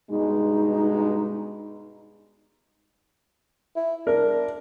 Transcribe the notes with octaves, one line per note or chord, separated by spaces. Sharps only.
G2 B2 G#3 D#4
E4
D4 A#4